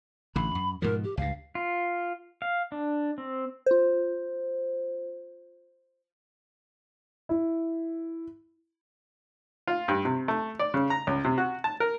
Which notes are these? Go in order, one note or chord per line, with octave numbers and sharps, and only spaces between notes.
A1 D3 B5
F#2
G#2 B2 F3 A#4
G4
C#2 G2 F5
F4
F5
D4
C4
F4 C5
E4
F4
G2
C3
A3
D5
C#3
A#5
C#2
C3
F#4
A5
A#4